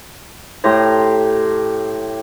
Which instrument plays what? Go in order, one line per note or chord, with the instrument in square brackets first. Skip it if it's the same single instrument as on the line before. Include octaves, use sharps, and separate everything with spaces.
[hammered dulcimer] A2 G4 A#5 C6